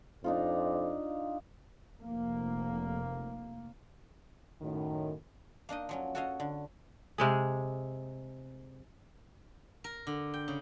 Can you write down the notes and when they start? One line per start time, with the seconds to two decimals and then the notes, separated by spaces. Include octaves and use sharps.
0.24 F2 D4 D#4 F4
2.02 F1 A#3
4.61 F#2 A2 D#3
5.69 A#3 D4 D#4 D#5
5.89 F3 F#3 C#4
6.15 F#4 A4 C#5 D#5 F5
6.40 D3
7.18 C3 G#3 G#4
9.84 A#4
10.07 D3
10.34 G5
10.48 C#3